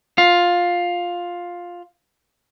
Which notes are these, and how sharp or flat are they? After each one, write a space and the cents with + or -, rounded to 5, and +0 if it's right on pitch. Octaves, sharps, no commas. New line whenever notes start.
F4 +10